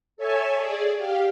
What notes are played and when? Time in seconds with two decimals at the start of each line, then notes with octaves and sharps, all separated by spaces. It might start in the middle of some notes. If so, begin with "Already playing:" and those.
0.17 A4 C#5 E5 G#5 A5
0.56 G#4 D5
0.97 G4 F5